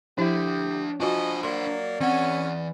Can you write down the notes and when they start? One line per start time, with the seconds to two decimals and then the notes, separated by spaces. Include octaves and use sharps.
0.18 F3 D4 E4 G4 E5
1.00 F3 D4 F4 F#4 C5 D#5 G#5
1.43 F#3 A#3 D5 C6
2.00 E3 C4 C#4 F#5